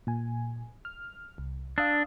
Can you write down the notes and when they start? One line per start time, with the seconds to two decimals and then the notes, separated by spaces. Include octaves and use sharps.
0.07 A#2 G#5
0.85 F6
1.38 C2
1.78 D4 F5 D#6 E6